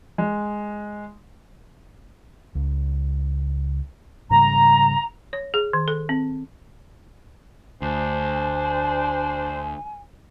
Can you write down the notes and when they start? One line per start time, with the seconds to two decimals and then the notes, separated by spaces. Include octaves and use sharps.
0.18 G#3
2.55 C#2
4.30 G#2 C#3 G3 A#5
5.33 C#5
5.54 G#4
5.73 D#3
5.88 A4
6.09 C4
7.82 D2 D4 C5 G#5